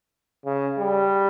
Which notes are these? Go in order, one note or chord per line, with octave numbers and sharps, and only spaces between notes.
C#3
G3